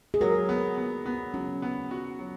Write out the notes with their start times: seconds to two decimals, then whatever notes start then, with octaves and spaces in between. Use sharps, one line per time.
0.14 G#4
0.21 F#3 A#4
0.49 B3
0.77 B3
1.06 B3
1.34 F#3 C#4
1.62 B3
1.91 F#4
2.19 F#3